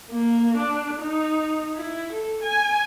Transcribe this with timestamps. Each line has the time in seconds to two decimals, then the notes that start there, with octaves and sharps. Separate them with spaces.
0.11 A#3
0.57 D4
1.01 D#4
1.76 E4
2.12 A4
2.42 G#5